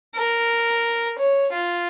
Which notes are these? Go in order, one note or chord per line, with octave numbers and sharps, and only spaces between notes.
A#4
C#5
F4